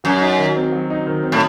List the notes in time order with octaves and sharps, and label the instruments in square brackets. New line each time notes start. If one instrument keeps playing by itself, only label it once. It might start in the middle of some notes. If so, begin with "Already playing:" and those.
[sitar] F#2 [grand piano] F#3
[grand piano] D#4
D#3
C4
F#3
D#4
D#3
C4
[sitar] A2